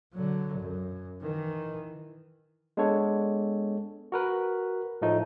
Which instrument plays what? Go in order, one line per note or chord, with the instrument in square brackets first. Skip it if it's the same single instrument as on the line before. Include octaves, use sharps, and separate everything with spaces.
[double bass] D3 F#3
F#2
D#3 E3
[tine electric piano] G#3 B3 D4 A4 C#5
F#4 A#4 B4
A2 F3 A3 D#4